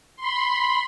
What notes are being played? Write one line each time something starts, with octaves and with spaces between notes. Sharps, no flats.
B5 C6